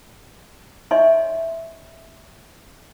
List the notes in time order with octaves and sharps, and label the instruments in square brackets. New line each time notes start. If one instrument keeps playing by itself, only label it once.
[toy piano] C#5 D#5 E5 G#5 C6 C#6